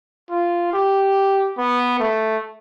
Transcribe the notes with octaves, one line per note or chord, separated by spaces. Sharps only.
F4
G4
B3
A3